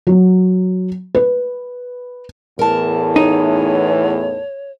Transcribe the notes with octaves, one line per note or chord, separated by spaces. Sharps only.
F#3
B4
E2 A2 A#4 A5
D#4 C#5